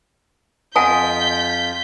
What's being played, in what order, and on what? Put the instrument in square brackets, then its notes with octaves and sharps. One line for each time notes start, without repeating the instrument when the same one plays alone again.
[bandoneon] F2 F4 [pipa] D#5 [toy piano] F#5 G#5 A5 [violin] G6 B6